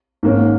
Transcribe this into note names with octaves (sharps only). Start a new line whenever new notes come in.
G#2 D#3 A#3 C#4